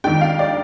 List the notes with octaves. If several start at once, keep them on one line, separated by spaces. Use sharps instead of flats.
F2 D#3 G#3 D4 G5
F5
D5